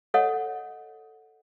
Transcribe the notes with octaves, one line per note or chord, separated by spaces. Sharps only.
A4 C#5 D#5 F#5